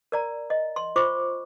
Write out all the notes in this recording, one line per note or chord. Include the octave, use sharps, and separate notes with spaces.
A#4 D5 A#5
D#5
C6
F4 C5 C#6 D6